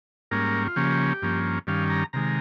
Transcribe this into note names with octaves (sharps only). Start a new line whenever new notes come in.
G#2 G3 A#3 C#4 A#4
F4
C#3 F3 A#3 C#4 G4
G2 F3 A#3 C#4
G2 D#3 G3 C#4 F5
A#5
C3 D#3 G#3 A#5